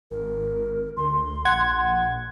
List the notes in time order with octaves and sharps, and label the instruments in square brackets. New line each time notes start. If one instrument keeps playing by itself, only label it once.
[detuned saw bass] G#1 [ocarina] A#4
[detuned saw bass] D2 [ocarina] C6
[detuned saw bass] A#1 [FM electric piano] F#5 G#6